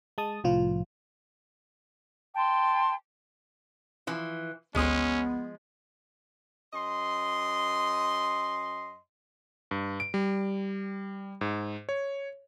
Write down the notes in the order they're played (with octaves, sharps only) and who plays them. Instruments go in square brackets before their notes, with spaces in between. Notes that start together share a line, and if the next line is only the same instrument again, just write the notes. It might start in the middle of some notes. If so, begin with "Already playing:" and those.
[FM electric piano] G#3 A5 D#6
C2 A2 F3 F4
[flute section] G5 A5 C6
[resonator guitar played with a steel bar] E3 F3
[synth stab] G#1 D2 D#6 [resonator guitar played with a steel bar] F3 G#3 [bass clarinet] B3 [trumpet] C#4
[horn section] F#2 D#5 C6
[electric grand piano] G2
D7
G3
G#2
C#5